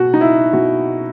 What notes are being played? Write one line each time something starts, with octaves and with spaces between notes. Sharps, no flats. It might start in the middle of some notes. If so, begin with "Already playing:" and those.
Already playing: B2 F#4
D#4
E4
B2 F#4